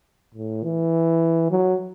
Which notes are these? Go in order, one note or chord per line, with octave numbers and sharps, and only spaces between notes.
A2
E3
F#3